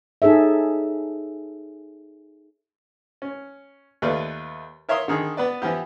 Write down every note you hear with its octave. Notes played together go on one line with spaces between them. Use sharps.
D#4 G#4 A4 C#5 E5
C#4
D#2 A3 F4 B4 D5
A#4 C#5 E5 F5 C6 D#6
D3 D#3 G#4
B3 B4 D5
E3 F3 B3 G4